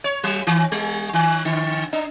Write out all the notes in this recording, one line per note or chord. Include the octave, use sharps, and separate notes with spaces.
C#5
F#3
D#3
G3
D#3
D3
D4